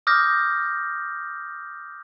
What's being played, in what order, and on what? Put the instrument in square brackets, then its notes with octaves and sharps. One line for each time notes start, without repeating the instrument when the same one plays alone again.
[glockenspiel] D6 D#6 F6 G6 A#6